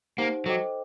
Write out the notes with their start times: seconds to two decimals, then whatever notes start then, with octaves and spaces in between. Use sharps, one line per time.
0.18 A#3 D#4 G4 C5 F#5
0.46 F#3 A4 C5 D#5 G5 D6